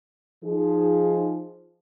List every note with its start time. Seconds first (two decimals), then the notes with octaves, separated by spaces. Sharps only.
0.44 F3 D#4 G#4